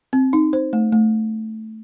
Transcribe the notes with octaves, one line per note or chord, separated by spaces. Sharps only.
C4
D#4
C5
A3
A3